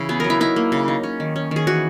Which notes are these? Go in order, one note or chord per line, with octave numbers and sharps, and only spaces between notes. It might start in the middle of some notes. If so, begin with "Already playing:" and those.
Already playing: C#3 E3 C#4 E4
B3 G#4
F#3 A#4
E4
D#4 E4
A#3
C#3
D#4
C#4
D#3
C#4
D#3 G#4
E3 F#4